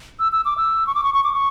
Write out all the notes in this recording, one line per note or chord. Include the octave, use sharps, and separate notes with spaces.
E6
E6
D6
E6
C#6
D6
C#6
C#6
D6
C#6